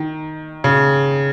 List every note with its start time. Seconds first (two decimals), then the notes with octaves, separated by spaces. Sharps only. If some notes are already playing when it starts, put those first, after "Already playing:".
Already playing: D#3
0.64 C#3